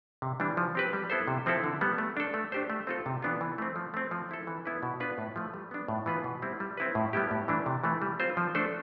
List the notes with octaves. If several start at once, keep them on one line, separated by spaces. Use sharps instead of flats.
C3
E3 G3 D4
F3
C4 G4 B4
G3
B3 E4 A4 C5
C3
F3 C4 E4 A4
D3
G3 B3
A3
D4 A4
A3
D4 G4 C5
A3
C4 F4 A4
C3
E3 B3 D4 F4
E3
A3 C4
F3
A3 C4
F3
C4 E4 A4
E3
B3 E4 B4
B2
B3 D4 F4 B4
A2
F3 A3
G3
B3 D4
A2
E3 B3 F4 B4
B2
G3 C4 E4
G3
C4 E4 B4
A2
G3 B3 E4 G4
A2
E3 A3 D4
C3
E3 A3
G3
C4 F4 C5
F3
A3 D4 A4 C5